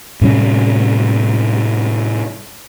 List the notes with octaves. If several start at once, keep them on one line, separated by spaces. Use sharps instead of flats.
A2 C3 G3 C#4